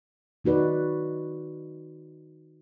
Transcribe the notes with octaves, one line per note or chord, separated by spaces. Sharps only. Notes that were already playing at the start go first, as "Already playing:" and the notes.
D#3 D#4 F#4 B4 D5